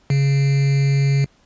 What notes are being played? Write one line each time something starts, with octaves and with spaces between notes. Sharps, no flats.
C#3